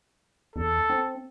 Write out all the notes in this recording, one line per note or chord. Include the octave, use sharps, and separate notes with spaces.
E2 A4
C4